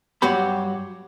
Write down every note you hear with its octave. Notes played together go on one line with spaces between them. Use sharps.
G2 F#3 F#4 G4 B5